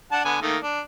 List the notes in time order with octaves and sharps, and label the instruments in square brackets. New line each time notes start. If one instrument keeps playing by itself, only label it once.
[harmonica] D4 F#5 A5
D3 B3 G#5
D#3 A3 A#3
D4